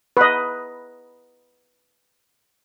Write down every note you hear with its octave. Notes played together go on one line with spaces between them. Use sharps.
B4 D#5